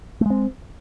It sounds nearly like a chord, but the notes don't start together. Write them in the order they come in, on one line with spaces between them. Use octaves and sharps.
A3 G#3 C4